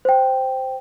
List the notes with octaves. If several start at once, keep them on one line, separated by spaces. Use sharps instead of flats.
C5 G5